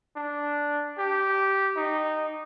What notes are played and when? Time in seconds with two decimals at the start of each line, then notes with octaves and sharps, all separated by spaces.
0.17 D4
0.99 G4
1.76 D#4